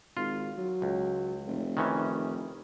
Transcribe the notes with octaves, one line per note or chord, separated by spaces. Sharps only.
G#1 F4
F#3
C#2
F1
D#3 E3 C#4